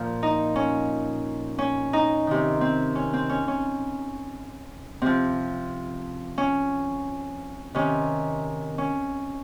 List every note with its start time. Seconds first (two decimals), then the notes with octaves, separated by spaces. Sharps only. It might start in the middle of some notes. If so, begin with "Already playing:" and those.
Already playing: A#2 F3 F4
0.23 D#4
0.56 C#4
1.58 C#4
1.93 D#4
2.27 C3 D#3
2.61 C4
2.95 C#4
3.13 C4
3.29 C#4
3.48 C#4
5.02 C3 F3 C4
6.38 C#4
7.75 C3 D#3 C#4
8.78 C#4